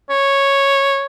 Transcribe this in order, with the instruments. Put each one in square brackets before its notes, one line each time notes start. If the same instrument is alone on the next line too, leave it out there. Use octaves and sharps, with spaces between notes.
[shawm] C#5